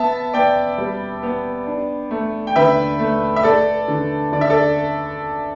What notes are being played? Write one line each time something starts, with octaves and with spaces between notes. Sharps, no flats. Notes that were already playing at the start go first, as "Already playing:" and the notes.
Already playing: B3 E5 A5
B3 D5 G5
G3
B3
D4
A3
G5
D3 B4 E5
A3
E5
A3 A4 D5
D3
D3 D5
E5
A4 D5